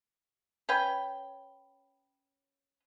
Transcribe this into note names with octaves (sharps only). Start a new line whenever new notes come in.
C#4 B4 G5